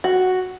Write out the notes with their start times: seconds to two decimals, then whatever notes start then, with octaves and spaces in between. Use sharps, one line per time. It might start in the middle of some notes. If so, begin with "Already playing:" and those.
0.04 F#4